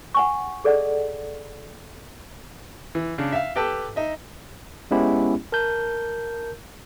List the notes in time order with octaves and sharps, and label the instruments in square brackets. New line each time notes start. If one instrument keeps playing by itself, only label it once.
[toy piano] F#5 G#5 C#6
G#4 A4 D5 D#5 F#5
[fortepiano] E3
C#3 D4
E5 F5
G4 A4 B4 G5 A5
D#4 D#5 E5
[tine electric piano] G#3 B3 C#4 E4 G4
A#4 A5 G6